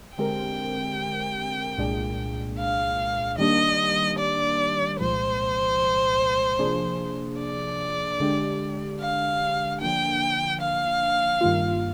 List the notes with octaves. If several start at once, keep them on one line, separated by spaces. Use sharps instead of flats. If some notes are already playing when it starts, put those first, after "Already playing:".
D3 G#3 C4 G4 A#4 G5
C2 A#2 G#3 D4 G#4
F5
D#3 G3 A#3 D4 G4 D#5
D5
C2 A#2 F3 G#3 C5
C3 F3 A#3 D4 G#4
D5
D3 G#3 D4 G4
F5
D3 F3 A#3 D4 G5
F5
G2 D#3 A#3 F4